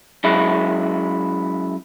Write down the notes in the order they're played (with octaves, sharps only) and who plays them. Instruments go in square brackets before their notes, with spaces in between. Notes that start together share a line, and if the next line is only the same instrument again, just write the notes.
[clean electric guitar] F#2 G#3 E4